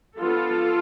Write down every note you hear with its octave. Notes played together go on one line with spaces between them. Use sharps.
F3 B3 D4 F4 A4